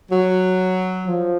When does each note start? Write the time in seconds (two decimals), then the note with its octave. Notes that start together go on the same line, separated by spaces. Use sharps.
0.11 F#3
1.06 F3